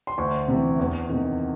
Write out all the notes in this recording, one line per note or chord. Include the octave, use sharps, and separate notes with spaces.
C6
D2 C#6
C3 E3
E2
C3 D#3